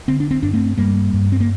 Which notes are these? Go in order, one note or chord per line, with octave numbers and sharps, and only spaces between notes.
D3 C4
D4
C4
G2 D4
A3 C4
G2 G3 A#3
G2
C4
A#3